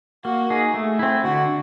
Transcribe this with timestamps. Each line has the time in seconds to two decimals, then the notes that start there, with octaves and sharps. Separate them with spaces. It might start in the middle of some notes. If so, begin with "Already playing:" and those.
0.25 A#3 F#4
0.50 D#4 G#4
0.74 A3
0.99 C4 E4
1.24 D3 F#4